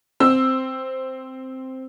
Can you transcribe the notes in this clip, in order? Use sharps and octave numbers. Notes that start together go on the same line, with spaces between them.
C4 E6